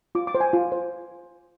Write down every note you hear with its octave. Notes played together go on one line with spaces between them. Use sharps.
F4 D6
D6
C5
G#5
F4
C5